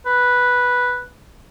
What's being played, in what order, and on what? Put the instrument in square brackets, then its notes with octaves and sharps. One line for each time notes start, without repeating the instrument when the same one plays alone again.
[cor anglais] B4